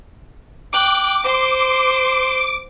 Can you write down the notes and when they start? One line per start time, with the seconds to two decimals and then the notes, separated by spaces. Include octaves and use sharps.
0.73 G5 D6 F#6
1.24 C5 C6